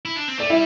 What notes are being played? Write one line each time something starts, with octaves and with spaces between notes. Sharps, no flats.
E4
D4
C4
A3 D5
G3 E4 E5